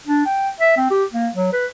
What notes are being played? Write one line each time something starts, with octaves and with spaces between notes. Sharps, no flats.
D4
G5
E5
C4
G4
A#3
F#3
B4